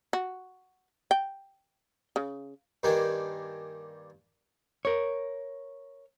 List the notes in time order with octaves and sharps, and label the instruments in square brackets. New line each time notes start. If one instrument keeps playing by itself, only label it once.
[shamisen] F#4
G5
C#3
[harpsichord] G2 D#3 A#3 D4 G5 G#5
[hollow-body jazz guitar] A#4 C#5